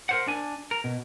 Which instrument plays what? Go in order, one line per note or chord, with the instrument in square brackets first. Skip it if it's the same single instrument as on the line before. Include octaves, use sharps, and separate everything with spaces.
[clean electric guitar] A#4 C5 F#5
D4 G#5
A#4
B2